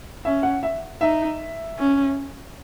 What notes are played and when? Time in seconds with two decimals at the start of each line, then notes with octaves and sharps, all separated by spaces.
0.25 C#4 E5
0.43 F#5
0.63 E5
1.01 D#4 E5
1.78 C#4